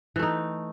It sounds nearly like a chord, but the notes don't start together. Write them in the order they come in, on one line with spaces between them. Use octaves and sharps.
E3 A3 D#4